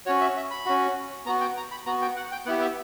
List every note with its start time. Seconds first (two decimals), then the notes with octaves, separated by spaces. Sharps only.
0.06 C#4 F#4 C#5
0.21 E5
0.36 E5
0.51 B5
0.66 C#4 F#4
1.26 B3 A#5
1.29 F#4
1.41 G5
1.57 A#5
1.71 B5
1.86 B3 F#4 A#5
2.02 G5
2.16 F#5
2.32 G5
2.46 B3 E4 G4 F#5
2.61 E5